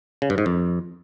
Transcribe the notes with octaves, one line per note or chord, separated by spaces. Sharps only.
C#3
G2
G#2
F2